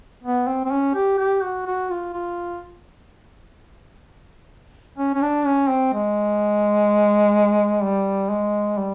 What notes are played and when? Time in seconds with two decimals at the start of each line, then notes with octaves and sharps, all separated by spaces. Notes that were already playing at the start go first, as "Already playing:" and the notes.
0.23 B3
0.47 C4
0.65 C4
0.71 C#4
0.95 G4
1.18 G4
1.42 F#4
1.66 F#4
1.90 F4
2.14 F4
4.99 C#4
5.14 C#4
5.22 D4
5.46 C#4
5.69 C4
5.94 G#3
7.83 G3
8.31 G#3
8.78 G3